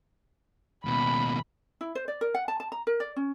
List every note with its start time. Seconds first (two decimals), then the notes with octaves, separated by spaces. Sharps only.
0.85 D#2 B2 B5
1.81 E4
1.95 C5
2.08 D5
2.21 A#4
2.35 F#5
2.48 A5
2.60 A5
2.72 A#5
2.87 A#4
3.00 D5
3.16 C#4